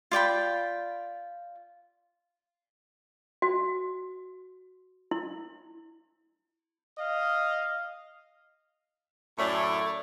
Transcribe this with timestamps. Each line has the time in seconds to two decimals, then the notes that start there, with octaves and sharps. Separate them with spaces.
0.11 F4 D5 G5 B5
3.42 F#4
5.11 E4
6.98 D#5 F5
9.39 F#2 A2 A3 C#5 D5